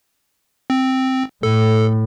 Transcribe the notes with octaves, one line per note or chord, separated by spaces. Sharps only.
C4
A2 A4